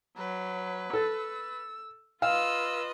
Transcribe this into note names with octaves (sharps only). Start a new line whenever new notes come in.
F#3 B4
A4 E6
F4 B4 D#5 F5 E6